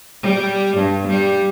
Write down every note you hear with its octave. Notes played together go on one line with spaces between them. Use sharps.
G3
G2
G3